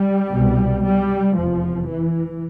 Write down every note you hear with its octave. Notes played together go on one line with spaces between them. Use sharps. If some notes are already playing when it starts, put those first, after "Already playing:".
Already playing: G3
C2 B2
G3
F1 E2 C3 F3
E3